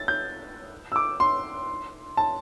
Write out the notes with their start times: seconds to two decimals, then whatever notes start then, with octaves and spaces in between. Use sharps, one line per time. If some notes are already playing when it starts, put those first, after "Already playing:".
Already playing: A6
0.08 G6
0.92 E6
0.96 D6
1.20 C6
2.17 A5